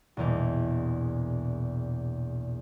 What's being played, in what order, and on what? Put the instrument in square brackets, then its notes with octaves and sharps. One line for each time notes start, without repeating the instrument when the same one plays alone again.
[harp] A#1 E2 B2